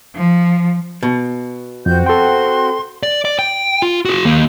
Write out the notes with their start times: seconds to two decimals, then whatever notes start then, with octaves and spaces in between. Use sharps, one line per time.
0.15 F3
1.03 B2
1.86 F2 C4 F#4 G6
2.06 A4 G5 C6
3.03 D5
3.25 D5
3.39 G5
3.82 F4
4.05 F#4 G#4
4.25 D#2 A#3